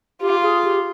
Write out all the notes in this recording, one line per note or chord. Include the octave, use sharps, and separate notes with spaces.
F4 G4
G#4
G4